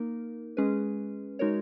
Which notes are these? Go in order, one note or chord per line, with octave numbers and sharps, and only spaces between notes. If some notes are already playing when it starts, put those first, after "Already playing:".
Already playing: A#3 D#4 A#4
G#3 C#4 G#4 B4
G#3 D#4 F#4 A#4 C#5